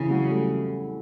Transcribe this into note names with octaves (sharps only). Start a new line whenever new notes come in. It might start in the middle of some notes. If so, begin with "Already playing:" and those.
Already playing: C#3 E3
F#3 G#3
G3 A3